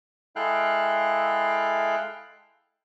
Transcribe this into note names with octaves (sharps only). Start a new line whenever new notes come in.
G#3 E4 A4 F5 G5 F#6